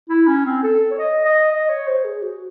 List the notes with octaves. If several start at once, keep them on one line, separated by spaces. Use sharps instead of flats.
E4
C#4
C4
A4
C#5
D#5
D#5
D#5
C#5
C5
G#4
F#4